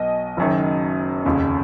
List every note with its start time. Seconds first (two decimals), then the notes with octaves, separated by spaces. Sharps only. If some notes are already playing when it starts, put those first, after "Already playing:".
Already playing: B1 B2 D#5
0.37 F#1 F#2 D#3
1.25 F1 D#2 C#3